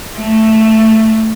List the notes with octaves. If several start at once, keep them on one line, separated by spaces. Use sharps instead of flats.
A3